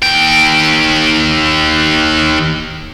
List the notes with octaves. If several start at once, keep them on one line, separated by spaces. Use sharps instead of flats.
D#2 G5